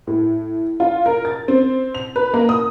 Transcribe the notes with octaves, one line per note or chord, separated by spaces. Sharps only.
A2
F4
A#4
A6
C4
F7
B4
A#3
D#6